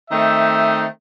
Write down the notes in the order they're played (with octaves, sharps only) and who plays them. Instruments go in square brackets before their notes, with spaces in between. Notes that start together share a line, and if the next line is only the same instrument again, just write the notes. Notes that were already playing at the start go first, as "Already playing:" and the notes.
[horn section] D#3 A3 C4 D#5 E5